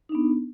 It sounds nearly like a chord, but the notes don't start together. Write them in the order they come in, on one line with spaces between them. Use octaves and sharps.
D#4 D4 B3